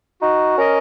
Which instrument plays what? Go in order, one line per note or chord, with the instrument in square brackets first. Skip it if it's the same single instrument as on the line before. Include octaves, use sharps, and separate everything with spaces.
[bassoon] D#4 [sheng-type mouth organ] F#4
[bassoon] C#4 [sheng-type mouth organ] A#4 D#5